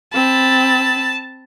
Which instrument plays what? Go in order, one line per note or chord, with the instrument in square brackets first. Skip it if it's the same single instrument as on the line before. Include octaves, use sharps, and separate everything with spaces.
[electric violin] C4 B5 [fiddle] A5